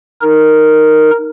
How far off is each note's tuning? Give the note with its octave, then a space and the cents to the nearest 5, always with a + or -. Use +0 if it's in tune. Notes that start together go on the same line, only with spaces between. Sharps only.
D#4 +0 A#4 -5